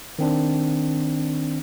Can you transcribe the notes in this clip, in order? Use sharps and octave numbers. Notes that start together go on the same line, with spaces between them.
D#3 C4 D4